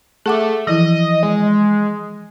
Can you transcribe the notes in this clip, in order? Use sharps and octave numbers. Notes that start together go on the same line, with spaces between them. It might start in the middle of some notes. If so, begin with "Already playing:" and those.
A3 G#4 F#5 D6
E3 F3 E4 D#5
G#3